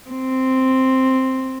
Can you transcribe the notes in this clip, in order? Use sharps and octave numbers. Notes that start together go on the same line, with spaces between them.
C4